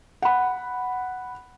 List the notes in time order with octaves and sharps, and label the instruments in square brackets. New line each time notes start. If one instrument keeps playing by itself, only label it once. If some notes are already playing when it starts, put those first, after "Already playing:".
[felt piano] F#5 B5